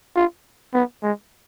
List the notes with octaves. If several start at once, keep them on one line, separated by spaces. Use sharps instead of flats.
F4
B3
G#3